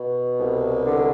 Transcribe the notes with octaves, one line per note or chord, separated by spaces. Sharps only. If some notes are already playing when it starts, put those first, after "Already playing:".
Already playing: B2
C2
D3